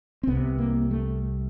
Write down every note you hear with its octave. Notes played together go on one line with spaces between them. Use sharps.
C4
C2 C3 B3
A#3
A3